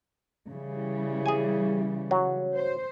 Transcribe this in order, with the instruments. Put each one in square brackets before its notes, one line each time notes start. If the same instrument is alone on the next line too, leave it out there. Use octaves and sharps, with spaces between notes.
[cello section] C#3 E3 G3
[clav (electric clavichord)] G#4 G#5
F#3
[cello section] C5